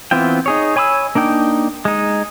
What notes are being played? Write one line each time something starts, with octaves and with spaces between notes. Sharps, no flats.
E3 B3 C4 F4 G5
D#4 G#4 C#5
C#5 G#5 B5 D6 E6
A#3 D4 D#4 G5
G#3 D#4